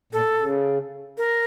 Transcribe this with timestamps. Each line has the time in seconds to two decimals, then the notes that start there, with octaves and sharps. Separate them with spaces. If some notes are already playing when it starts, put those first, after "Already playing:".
0.13 A#2 A4
0.39 C#3
1.18 A#4